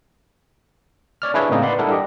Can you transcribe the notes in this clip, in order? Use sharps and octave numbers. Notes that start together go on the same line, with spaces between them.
C#5 D5 F6
D4 E4 G#4 B4 C#5 E5
A2 C#3 A#3 C4 D#4 D#5
B4 D5 F#5 B5 C6
G3 D4 E4 A4 A#4 F#5
G4 D#5